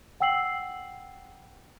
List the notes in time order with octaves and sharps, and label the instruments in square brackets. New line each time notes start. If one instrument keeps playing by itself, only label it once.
[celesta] F#5 G5 E6 C7 F#7